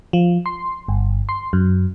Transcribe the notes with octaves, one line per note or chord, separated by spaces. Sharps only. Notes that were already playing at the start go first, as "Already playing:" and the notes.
F3
C6
G1
C6
F#2